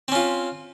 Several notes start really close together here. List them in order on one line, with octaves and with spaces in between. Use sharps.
C4 C#4 F4